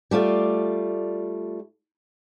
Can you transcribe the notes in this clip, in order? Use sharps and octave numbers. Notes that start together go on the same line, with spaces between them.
G3 A3 F4 D5